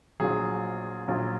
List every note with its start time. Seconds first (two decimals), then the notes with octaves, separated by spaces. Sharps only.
0.20 A#1 A#2 F#3 G#4
1.08 A#1 A#2 F#3